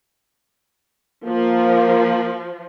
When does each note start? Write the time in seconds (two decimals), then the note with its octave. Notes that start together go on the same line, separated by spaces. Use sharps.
1.25 F3 A#3